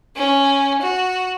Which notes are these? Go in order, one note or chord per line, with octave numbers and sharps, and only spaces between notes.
C#4
F#4